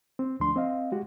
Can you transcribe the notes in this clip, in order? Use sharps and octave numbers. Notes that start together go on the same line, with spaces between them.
C4
D2 F3 A3 D4 C6
C4 D#5 F5
G#3 F#4 G4